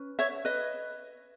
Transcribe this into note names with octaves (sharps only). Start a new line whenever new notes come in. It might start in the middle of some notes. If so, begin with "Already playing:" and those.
Already playing: C#4 B4
C#5 E5
B4 D#5